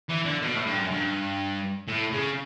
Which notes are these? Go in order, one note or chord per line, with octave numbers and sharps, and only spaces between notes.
E3
D3
B2
A2
G2
F#2
G2
A2
C#3